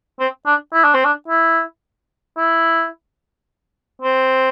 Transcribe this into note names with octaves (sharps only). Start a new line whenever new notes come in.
C4
D4
E4
D4
C4
D4
E4
E4
C4